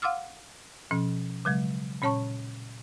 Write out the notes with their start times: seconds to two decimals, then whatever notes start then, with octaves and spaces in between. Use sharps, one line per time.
0.02 F5 F#5 C6 D6 E6 F6
0.91 B2 F3 C#4
1.45 C#3 F#3 G#3
2.02 A#2 C#4 C#5 A5 C#6